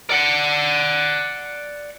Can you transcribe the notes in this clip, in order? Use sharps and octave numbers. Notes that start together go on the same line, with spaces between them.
D5 F#5